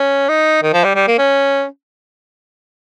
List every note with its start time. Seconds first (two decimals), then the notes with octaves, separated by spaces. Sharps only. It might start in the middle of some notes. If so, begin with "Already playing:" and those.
Already playing: C#4
0.29 D#4
0.63 D#3
0.73 F3
0.84 G3
0.95 G3
1.07 A#3
1.18 C#4